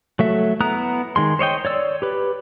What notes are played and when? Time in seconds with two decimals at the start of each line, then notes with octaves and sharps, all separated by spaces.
0.19 F#3 A3 E5
0.60 B3 E4 A#5 D#6 F#6
1.16 D#3 G#3 C6
1.39 C5 C#5 D#5 G5
1.65 C#5 D5 E6
2.02 G4 B4